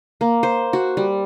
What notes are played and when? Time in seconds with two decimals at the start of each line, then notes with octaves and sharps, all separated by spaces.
0.21 A#3
0.43 C5
0.73 F#4
0.97 G3